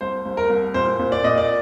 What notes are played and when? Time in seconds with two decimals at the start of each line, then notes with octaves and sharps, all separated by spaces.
0.01 C2 C5
0.26 C2
0.37 A#4
0.50 C2
0.74 A#2 C5
0.99 A#2
1.12 D5
1.24 A#2 D#5
1.38 D5